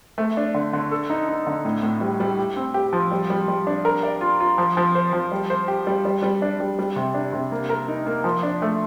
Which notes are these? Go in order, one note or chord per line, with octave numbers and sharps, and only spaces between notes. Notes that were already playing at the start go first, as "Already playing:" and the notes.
A3
D4
D3
D3
A4
D#4
D#4
D3
A2
A2
G3
G3
G4
C4
G4
F3
G3
G3
G3
D4
A#4
D5
F4
F4
F3
F3
C5
F3
G3
C5
G4
G3
G3
G3
D4
G3
G3
C3
D4
C3
A#3
A#4
D#4
A#3
F3
D4
A3